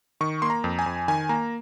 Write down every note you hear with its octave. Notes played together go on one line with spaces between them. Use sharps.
D#3 C#6
A#3 C6
A#5
F2
G#5
F2
D#3 G#5
A#3 A#5